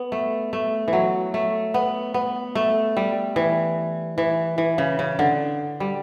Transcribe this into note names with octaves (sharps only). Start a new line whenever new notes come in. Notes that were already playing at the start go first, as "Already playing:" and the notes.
Already playing: B3
A3
A3
E3
F#3
A3
B3
B3
A3
G3
E3
E3
E3
C#3
C#3
D3
G3